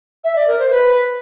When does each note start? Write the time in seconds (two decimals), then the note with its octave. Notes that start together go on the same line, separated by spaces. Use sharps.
0.24 E5
0.36 D5
0.47 A#4
0.59 C5
0.71 B4